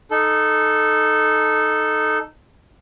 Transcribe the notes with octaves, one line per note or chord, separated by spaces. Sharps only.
D#4 A4